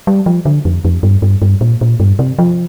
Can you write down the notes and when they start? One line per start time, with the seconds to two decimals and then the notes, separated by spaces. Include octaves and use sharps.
0.07 G3
0.26 F3
0.46 D3
0.65 F2
0.85 F2
1.03 G2
1.22 G2
1.42 G2
1.61 A#2
1.81 A#2
2.00 G2
2.19 C3
2.39 F3